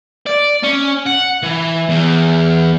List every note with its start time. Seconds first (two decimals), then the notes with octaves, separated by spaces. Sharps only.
0.27 D5
0.64 C#4
1.07 F#5
1.43 E3
1.89 E2